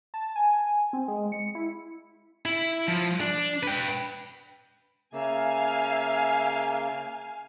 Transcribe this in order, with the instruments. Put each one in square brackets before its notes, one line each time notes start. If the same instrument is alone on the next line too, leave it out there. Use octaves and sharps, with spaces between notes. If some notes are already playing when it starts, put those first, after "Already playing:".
[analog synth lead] A5
G#5
C4
G#3
C#7
E4
[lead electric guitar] E4
F3
D4
B4 G5
[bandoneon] C#3 A#3 [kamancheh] E5 [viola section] F5 G#5